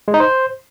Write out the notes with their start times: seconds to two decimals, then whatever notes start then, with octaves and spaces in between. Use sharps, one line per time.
0.08 G#3
0.14 D#4
0.20 C5